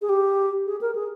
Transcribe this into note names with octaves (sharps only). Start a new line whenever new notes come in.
G#4
G4
G#4
A#4
G#4